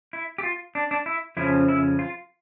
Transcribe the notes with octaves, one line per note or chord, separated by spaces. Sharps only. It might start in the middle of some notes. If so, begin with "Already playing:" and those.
E4
G4
F4
D4
D4
E4
F2 C#3 F3 C#4 E4
E4
F4